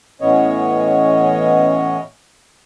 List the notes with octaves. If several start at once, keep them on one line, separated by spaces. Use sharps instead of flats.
A2 E3 B3 C#4 C#5 D#5